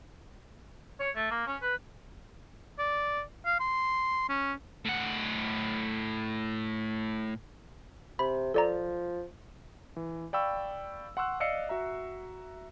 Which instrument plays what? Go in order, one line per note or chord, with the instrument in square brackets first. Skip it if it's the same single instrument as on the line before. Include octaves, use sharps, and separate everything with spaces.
[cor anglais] C#5
A3
A#3
C#4
B4
[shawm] D5
F5
C6
C#4
[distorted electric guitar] A2 F#5
[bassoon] C3 [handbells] B5
[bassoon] F3 [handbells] A4 D5 A#5
[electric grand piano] E3
D5 F5 G5 B5 C#6 E6
F#5 C6 C#6 E6 F#6
D5 D#5 F5 E6 C7 C#7
F#4 E5 A#5